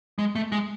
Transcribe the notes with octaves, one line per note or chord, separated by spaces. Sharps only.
G#3
A3
G#3